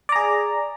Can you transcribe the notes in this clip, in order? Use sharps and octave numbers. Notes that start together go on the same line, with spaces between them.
G#4 D5 A#5